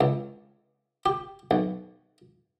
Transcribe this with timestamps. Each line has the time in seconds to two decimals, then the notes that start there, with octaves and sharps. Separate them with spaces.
0.01 C#2
1.06 G4
1.51 B1